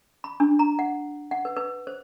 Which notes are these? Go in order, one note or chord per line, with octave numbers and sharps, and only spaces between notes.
B5
D4
A#5
F#5
F#5
B4
B4
C5